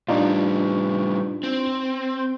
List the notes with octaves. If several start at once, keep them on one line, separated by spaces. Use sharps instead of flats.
A2 G3 D4 D#4 F4
C4